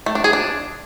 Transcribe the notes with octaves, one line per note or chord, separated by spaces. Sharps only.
A3
D4
G#4
D4